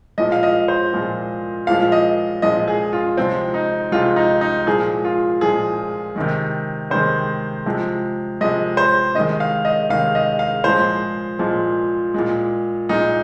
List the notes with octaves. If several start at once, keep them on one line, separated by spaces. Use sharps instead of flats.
A#2 F3 G#3 D#5
F5
D#5
C5
A#2 F3 G#3
A#2 F3 G#3 F5
D#5
A#2 F3 G#3 D#5
G#4
F4
C3 F3 G#3 C4
D#4
C3 F3 G#3 F4
D#4
D#4
A#2 F3 G#3 G#4
F4
A#2 F3 G#3 G#4
C3 D#3 G#3
C3 D#3 G#3 C5
C3 F3 G#3
C3 F3 G#3 D#5
C5
C3 D#3 G#3 D#5
F5
D#5
C3 D#3 G#3 F5
D#5
F5
A#2 F3 G#3 C5
A#2 F3 G#3
A#2 G#3
A#2 G#3 D#4